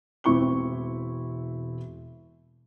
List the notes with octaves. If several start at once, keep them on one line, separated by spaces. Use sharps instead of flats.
E1 C4 E4 C#6 D6 G7